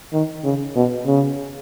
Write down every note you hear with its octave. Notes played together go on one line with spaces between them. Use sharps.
D#3
C#3
B2
C#3